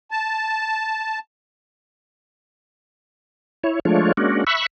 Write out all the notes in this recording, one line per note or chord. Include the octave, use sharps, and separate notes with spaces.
A5
E4 C#5
F3 G#3 A3 D4 F4 C#5
G#3 A#3 C#4 D4 F#4
E5 B5 C#6 E6 F#6